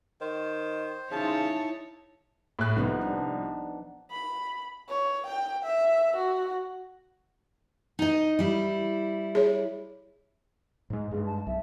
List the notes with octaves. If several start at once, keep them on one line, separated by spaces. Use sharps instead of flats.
D#3 C5
C#3 D#4 E4 C#5 A5
A2 F#6
C2 F3 B3 D#4
D4
B5
C#5
G5
E5
F#4
D#4 D#5
G3 E4
G#4 C#5
G#2 G#3
G2 G#3 G#4
A5
B1 E5